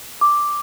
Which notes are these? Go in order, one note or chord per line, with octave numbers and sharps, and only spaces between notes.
D6